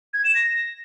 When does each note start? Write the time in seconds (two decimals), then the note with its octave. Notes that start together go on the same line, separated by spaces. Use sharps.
0.14 G#6
0.24 E7
0.35 A#6